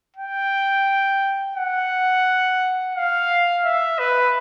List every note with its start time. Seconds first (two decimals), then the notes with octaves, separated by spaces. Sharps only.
0.17 G5
1.56 F#5
2.95 F5
3.65 E5
3.99 B4